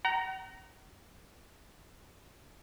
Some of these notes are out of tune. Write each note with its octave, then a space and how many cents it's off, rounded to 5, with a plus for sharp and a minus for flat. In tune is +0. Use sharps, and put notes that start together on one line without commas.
F#5 +45 A#5 +0